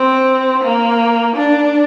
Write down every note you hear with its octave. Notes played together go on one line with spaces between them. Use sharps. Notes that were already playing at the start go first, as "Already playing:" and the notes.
Already playing: C4
A#3
D4